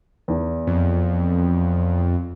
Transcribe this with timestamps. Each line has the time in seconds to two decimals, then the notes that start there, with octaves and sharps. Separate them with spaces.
0.28 E2 E3
0.67 F2